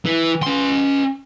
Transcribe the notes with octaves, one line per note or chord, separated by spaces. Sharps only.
E3
C#4 C6